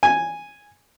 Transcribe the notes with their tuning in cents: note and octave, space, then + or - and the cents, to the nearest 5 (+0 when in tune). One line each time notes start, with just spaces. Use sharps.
G#5 -5